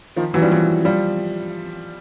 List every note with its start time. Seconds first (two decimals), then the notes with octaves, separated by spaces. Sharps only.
0.16 D#3 F3
0.34 E3 F#3
0.42 F3 G3
0.51 E3 F#3
0.85 F3 G3